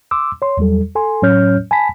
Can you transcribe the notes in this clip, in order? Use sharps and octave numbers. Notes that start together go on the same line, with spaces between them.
C6 D6 E6
C#5 C6
E2 F#3 G3 A4
A4 G#5 C6
A2 F#3 C#4 C#5 F6 G6
G#5 A5 B5 B6